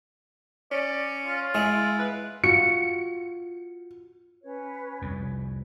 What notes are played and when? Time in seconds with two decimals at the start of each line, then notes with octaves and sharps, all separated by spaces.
0.72 C#4 D5
1.26 F4
1.54 G#3 E4
1.99 B4
2.44 F4 F#4 C#7
4.44 C#4 B4 C#5
5.02 C2 F2